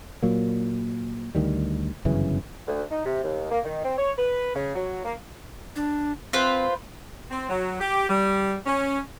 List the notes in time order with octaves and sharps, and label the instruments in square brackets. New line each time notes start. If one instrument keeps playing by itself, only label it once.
[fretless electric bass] A#2 F#3 A#3
D2 D#3 G3
G1 F#2 C#3 E3
[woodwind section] D2
D#4
C3
D#2
A#3
D#3
C4
C#5
B4
C#3
F#3
A#3
[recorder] D4
[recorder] C4 [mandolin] F4 B4 C5
[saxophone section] C4
F#3
G4
G3
C#4